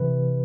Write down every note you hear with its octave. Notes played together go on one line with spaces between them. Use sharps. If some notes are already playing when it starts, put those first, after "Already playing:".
Already playing: C3 E3 B4